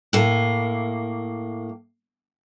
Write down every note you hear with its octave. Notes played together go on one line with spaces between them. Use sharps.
A2 A#3